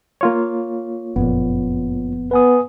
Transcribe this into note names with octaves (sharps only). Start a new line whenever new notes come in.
A#3 F4 C#5
F#1 F2 A#2 B3
B3 B4 G#5 D#6